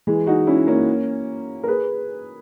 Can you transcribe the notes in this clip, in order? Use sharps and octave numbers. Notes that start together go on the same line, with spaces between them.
E3 G#3
D#4 F#4
C#4 E4
A#3 C#4
A#4
G#4 B4